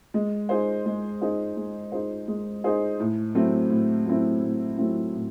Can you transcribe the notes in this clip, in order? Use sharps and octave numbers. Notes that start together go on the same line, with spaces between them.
G#3
D#4 G#4 C5
G#3
D#4 G#4 C5
G#3
D#4 G#4 C5
G#3
D#4 G#4 C5
A2
F#3 A3 C4 E4
A2
F#3 A3 C4 E4
A2
F#3 A3 C4 E4
A2